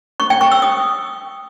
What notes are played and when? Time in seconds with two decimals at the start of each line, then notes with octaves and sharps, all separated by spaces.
0.20 C#6
0.30 G5
0.41 C#6
0.52 E6
0.62 D#6